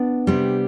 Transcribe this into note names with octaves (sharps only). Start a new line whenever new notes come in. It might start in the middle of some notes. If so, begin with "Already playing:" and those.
Already playing: B3 D4
C3 G3